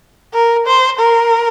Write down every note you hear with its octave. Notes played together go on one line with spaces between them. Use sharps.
A#4
C5
A#4